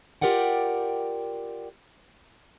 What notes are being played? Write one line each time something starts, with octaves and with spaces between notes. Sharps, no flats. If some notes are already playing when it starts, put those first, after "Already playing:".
F4 G4 A#4 D5 F#5 G5